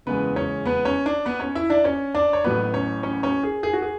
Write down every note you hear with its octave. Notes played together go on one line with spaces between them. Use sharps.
F#1 E2 C#3 G#3 B3 B4
C#4 C#5
B3 B4
C#4 C#5
D4 D5
B3 B4
C#4 C#5
E4 E5
D4 D5
C#4 C#5
D4 D5
C#5
A1 A2 F#3 B3 B4
C#4 C#5
C#4 C#5
C#4 C#5
G#4
G#4
F#4
G#4